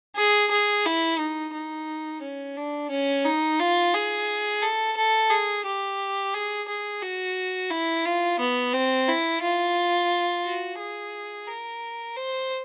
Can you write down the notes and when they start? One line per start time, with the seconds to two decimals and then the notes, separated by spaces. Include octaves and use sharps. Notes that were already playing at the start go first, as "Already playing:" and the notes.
0.16 G#4
0.51 G#4
0.85 E4
1.19 D#4
1.54 D#4
2.22 C#4
2.57 D4
2.90 C#4
3.25 D#4
3.59 F4
3.94 G#4
4.62 A4
4.96 A4
5.30 G#4
5.65 G4
6.34 G#4
6.68 G#4
7.02 F#4
7.70 E4
8.05 F4
8.39 B3
8.73 C4
9.08 E4
9.42 F4
10.45 F#4
10.79 G#4
11.47 A#4
12.16 C5